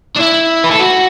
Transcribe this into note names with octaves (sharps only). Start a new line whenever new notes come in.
D4
E4
B4
A4
F#4